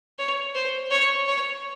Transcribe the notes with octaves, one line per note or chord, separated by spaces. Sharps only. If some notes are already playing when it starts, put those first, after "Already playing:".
C#5
C5
C#5
C#5